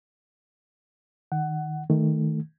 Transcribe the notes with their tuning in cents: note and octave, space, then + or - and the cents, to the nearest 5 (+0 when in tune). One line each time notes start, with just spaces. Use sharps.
D#3 +0 F#5 +15
D#3 +10 A3 +0